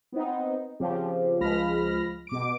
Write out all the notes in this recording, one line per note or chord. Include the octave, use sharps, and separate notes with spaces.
B3 C4 D#4
C#3 F3 C4 G4
C#2 F3 G#3 B5 F6 A#6
B2 D6 D7